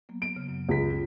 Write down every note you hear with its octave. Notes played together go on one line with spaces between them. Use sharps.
F#3 A#3 B3
D7
C#3
F#2 F#3
C#2 B6
C#4 F4 G4